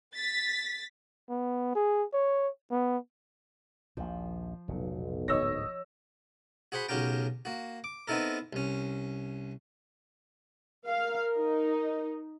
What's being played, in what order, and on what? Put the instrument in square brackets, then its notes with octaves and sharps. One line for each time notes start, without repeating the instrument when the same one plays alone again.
[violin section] A6 B6
[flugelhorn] B3
G#4
C#5
B3
[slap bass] A#1 D#2 A#2 [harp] F3
[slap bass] F1 A#2 [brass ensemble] B1
[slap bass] D1 G#2 D3 [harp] C#5 [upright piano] D#5 E6 A#6
[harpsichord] F#4 G#4 C5 F#5 B5
B1 C#3 F#4 G4 A#4 G5
A#3 F#4
D6
B3 C4 D#4 E4 A4 A#4
C2 C#4
[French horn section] A#4 [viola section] F5
[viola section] D#4